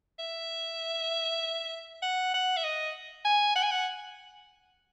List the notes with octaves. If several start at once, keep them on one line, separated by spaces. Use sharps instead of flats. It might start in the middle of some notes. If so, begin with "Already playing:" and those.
E5
F#5
F#5
E5
D#5
G#5
F#5
G#5
F#5